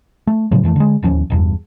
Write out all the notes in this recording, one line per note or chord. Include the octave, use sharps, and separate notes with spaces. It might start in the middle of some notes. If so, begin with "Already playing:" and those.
A3
A2 C#3 F3 F#3
F2 E3 G#3 A3
D3 G#3
D1 D#2 F3 C#4
F1 E2 G2